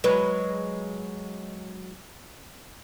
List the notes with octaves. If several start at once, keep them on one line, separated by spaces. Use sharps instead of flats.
F#3 G#3 B4